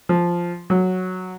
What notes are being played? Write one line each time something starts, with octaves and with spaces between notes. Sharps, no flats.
F3
F#3